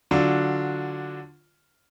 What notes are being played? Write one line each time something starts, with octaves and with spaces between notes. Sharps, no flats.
D3 F#3 D4 F4